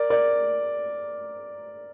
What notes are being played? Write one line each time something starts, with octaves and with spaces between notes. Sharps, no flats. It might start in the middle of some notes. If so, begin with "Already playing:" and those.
Already playing: A#4 D5
A#4 D5